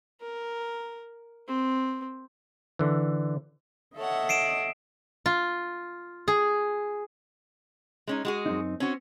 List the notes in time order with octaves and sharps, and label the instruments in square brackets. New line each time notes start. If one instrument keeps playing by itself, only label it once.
[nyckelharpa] A#4
C4
[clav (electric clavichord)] D3 E3
[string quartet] A4 C#5 F#5 [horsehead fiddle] D#5 E5
[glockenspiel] C7 D7 E7
[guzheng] F4
G#4
[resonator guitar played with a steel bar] G#3 C#4 D#4
G#3 F#4 G#4
[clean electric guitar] F#2 C4 D#4
[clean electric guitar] C4 [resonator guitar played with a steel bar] C#4 F#4